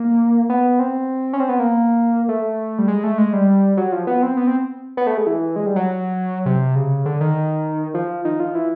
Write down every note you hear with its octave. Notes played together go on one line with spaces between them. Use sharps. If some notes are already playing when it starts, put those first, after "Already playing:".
Already playing: A#3
B3
C4
C#4
C4
B3
A#3
A3
G3
G#3
A3
G#3
G3
F#3
F3
B3
C4
B3
C4
B3
A3
G#3
E3
G#3
G3
F#3
C3
C#3
D3
D#3
F3
D#3
F3
E3